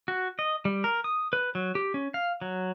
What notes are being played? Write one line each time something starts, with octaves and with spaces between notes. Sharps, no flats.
F#4
D#5
G3
A#4
D#6
B4
F#3
G4
C#4
F5
F#3